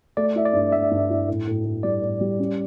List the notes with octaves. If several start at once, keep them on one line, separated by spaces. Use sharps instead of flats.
A3 D5
E4 E5
D5
G2
G2 E5
G2
E4
A2
A2
A2
G3 D5
A2
G3
C#4